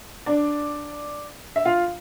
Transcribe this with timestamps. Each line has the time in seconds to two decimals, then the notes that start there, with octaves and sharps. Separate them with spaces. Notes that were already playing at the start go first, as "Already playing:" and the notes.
0.26 D4 D5
1.56 E5
1.65 F4 F5